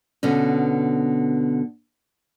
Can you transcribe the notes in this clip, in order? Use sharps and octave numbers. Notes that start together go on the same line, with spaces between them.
B2 D3 B3 C#4